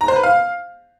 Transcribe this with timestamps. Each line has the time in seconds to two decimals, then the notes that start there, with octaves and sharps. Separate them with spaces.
0.01 A#5
0.08 C5
0.16 B4
0.23 F5